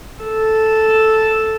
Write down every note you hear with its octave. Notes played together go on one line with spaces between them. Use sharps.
A4